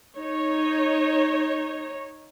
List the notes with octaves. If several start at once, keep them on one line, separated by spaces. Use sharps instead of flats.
D#4 C#5